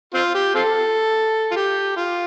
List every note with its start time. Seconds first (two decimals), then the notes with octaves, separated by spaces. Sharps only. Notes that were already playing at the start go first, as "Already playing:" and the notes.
0.14 C4 F4
0.35 G4
0.55 C4 F4 A4
1.51 F4
1.56 G4
1.97 F4